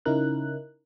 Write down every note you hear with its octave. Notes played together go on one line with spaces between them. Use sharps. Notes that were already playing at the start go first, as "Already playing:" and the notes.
C#3 C#4 D#4 E4 A#4 F#6